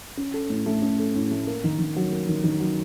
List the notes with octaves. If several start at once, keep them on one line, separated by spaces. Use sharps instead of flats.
C#4
A4
A2
A3
C#4
A4
A2
A3
A#3
D#3
D#3
F#3
A#3
D#3
D#3
F#3